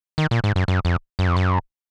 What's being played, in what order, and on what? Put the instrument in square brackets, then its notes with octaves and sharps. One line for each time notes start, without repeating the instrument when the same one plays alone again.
[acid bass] D#3
A#2
G#2
F#2
F#2
F2
F#2
F2
F#2